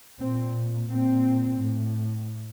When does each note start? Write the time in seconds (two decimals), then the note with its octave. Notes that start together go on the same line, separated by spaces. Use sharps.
0.20 A#2 C4
0.89 A#2 C4
1.59 A2